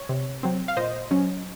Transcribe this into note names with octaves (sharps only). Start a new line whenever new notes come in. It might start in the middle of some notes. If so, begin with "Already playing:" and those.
Already playing: C#5
C3
F#3 C4
F5
A#2 C5 D#5
F#3 C#4